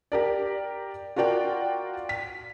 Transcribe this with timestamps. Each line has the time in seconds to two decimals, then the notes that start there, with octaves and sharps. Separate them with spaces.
0.12 G4 A#4 D5
1.16 F4 F#4 A#4 D5 G5
2.09 B6